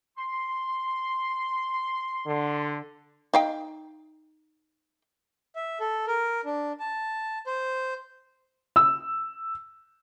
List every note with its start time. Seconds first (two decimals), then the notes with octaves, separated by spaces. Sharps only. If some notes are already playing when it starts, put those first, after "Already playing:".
0.17 C6
2.27 D3
3.34 D#4 F5 G5
5.56 E5
5.80 A4
6.07 A#4
6.45 D4
6.80 A5
7.47 C5
8.76 E6